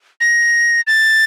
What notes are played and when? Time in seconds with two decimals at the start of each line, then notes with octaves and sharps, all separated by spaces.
0.21 A#6
0.87 A6